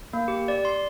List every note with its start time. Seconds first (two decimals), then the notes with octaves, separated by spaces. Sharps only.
0.13 A#3
0.28 G4
0.48 D5
0.65 C6